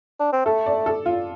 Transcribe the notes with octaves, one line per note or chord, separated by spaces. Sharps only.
D4
C4
A3 A4
D5
A4
F4